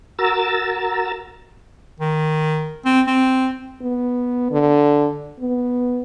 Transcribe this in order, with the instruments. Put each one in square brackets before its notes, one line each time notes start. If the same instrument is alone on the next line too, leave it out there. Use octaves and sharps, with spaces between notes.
[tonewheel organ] F#4 A#4 A#5 E6 A6
[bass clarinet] D#3
C4
C4
[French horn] B3
D3
B3